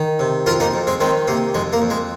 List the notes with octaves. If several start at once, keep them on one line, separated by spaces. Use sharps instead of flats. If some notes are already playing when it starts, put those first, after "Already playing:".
Already playing: D#3
C3
F2 F4 A#4
A#3 D#4
F2
G#3 C4
D#3 G#3 C4
C3 A#3
F2 G#3
A#3
F2
G#3